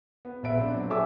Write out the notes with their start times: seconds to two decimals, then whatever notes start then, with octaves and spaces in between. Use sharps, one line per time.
0.25 B3
0.43 A#1 B2 B4 E5 D7
0.59 C4 D4
0.75 F#3
0.90 A4 C#5 E5 G#5 D6 E6